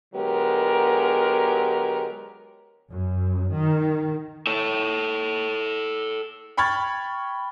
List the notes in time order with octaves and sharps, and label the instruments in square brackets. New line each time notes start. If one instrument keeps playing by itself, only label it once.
[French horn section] D3 F#3 G#3 B3 G4 A#4
[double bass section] F#2
D#3
[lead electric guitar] A4 C#5
[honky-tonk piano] G5 B5 C#6 F6 G#6 A6